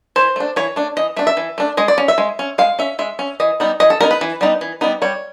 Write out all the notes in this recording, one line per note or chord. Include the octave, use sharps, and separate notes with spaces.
E3 C5
A3 D4
E3 C#5
A3 D4
E3 D#5
A3 D4 E5
E5
E3
A3 D4
G#3 D#5
D5
C#4
E5
G#3
C#4
G#3 F5
C#4 E5
G#3 E5
C#4
E3 D#5
G3 B3 D#4
E3 D#5
A4
G3 B3 D#4 A#4
B4
E3
G3 B3 D#4
E3
G3 B3 D#4
G3 C#5